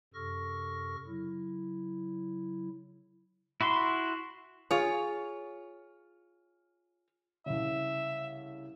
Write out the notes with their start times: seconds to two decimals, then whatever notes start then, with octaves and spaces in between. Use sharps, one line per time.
0.14 F#2 C3 A4 C#6 F6 A#6
1.06 C#3 F#3 E4
3.61 E4 F#4 B5 C6
4.71 F4 G#4 C#5
7.46 C2 C#3 E5